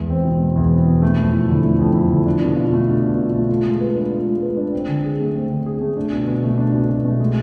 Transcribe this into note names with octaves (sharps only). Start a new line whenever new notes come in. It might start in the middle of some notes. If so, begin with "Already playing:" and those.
Already playing: E2 G#3
C4
B2
G#3
E2
C4
B2
A3
F2
E4
D3
A3
F2
E4
D3
D4
B2
F4
A3
D4
B2
F4
A3
F4
G#3
B4
D4
F4
G#3
B4
D4
C4
D3
G#4
A3
C4
D3
G#4
A3
D4
B2
B2
A3
D4
B2
B2
A3
G#3